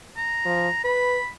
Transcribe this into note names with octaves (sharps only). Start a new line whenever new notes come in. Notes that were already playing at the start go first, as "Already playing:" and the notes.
A#5
F3
B4 B5